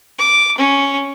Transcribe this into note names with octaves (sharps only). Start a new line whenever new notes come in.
D6
C#4